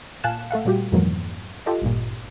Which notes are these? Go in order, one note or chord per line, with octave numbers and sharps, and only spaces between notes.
A#2 F5 G#5 A5 F#6 E7
A3 A4 F5 F#5
A#2 G3 F#4 G4
F2 G#2 B2 E3 F#3 A#3
F4 G4 A4 D#5
G#1 G2 A#2